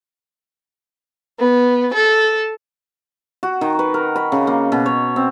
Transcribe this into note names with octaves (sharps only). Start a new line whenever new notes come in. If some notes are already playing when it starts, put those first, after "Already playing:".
B3
A4
F#4
D#3
B4
A#4
B5
C#3
A#3
B2
C#5
C4